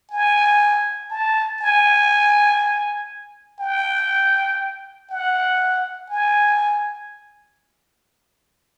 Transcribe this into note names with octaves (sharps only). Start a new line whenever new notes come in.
G#5
A5
G#5
G5
F#5
G#5